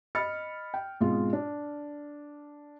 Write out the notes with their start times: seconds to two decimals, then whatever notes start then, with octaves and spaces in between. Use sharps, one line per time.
0.15 D#5 B5 F6 A6 C#7
0.74 G5
1.01 G#2 B2 G#3 C4 F4
1.33 D4